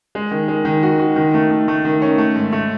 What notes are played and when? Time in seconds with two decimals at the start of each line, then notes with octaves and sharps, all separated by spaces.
0.15 G#3
0.31 D#3
0.48 G#3
0.65 D#3
0.83 F#4
0.99 F#4
1.16 D#3
1.34 A3
1.51 A3
1.68 A3
1.85 D#3
2.02 C#4
2.18 A3
2.36 G#2
2.53 A3